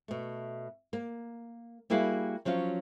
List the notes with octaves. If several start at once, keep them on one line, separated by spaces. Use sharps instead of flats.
B2 A3
A#3
G3 A#3 E4 F#4 G#4 F5
F3 F#3 C#4 F5